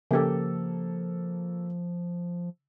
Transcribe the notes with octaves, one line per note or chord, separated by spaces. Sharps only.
C#3 F3 A#3 G4 A4